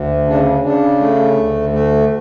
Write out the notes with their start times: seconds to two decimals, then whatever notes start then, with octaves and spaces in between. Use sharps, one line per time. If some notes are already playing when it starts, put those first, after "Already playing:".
Already playing: D2
0.27 C#3 D4
0.63 C#3 D4
1.00 A3
1.37 D2
1.73 A3